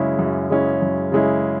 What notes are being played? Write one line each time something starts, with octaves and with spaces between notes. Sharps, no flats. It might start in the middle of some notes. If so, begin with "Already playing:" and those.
Already playing: F#2 C#3 G#3 C#4 E4
F#2
C#3 G#3 C#4 E4
F#2
C#3 G#3 C#4 E4